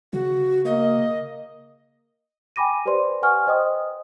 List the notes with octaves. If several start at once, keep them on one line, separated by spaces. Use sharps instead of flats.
C#3 F#4
A#3 D#5
G5 G#5 B5 D6 A#6 D#7
G4 B4 C5 D5 C6
B4 F#5 G#5 C#6 F6
C5 D#5 G5 C6 D#6